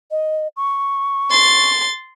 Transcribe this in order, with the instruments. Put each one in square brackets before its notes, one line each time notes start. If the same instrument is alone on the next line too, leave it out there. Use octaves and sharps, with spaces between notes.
[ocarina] D#5
C#6
[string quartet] C6 A6